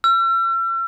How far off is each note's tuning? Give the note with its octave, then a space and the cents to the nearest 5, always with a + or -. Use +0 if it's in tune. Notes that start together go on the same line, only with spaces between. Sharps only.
E6 +45